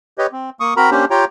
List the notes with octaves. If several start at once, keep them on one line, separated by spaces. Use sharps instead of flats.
G4 B4 C#5 D#5
C4
A#3 C#6 D#6
C4 F#4 A#4 A#5 B5
A#3 C#4 D4 G4 C5
F4 G4 C#5 G5 A#5